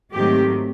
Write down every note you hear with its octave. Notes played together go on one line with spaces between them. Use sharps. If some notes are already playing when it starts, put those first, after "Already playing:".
G#2 D#3 F#3 A3 C4 G4